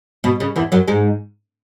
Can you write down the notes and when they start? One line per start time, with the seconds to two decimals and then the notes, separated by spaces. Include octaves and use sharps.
0.24 B2
0.40 C#3
0.56 E2 E3
0.72 F#2 F#3
0.88 G#2 G#3